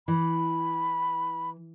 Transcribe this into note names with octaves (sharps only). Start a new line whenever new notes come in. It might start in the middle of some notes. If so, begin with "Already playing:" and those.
E3 B5